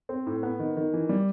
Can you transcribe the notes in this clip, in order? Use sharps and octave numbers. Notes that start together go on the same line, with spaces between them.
C4
A2
B3
D#3
D#3
E3
G3